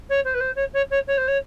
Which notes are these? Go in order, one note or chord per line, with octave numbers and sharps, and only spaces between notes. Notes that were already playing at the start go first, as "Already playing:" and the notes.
C#5
C5
B4
C5
C#5
C#5
C#5
C#5
C5
C#5